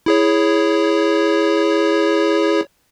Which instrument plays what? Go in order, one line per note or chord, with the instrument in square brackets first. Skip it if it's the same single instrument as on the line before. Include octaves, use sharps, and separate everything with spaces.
[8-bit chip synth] E4 G#4 C#5